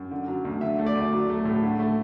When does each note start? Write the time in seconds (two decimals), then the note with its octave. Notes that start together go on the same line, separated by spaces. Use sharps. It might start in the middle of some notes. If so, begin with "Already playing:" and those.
Already playing: F#2
0.11 D3
0.28 F#3
0.45 D2
0.61 D3 E5
0.79 A3
0.86 D5
0.95 D2
1.13 F#3
1.29 A3
1.45 A2
1.63 D3
1.79 A3